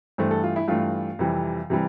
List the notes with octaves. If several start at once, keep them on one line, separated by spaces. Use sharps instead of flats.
G2 E3 A3 C5
A4
F4
E4
G2 E3 A3 F4
F2 C3 E3 G3
C3 E3 G3